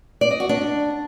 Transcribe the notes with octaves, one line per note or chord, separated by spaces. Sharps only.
D5
D#5
F#4
D4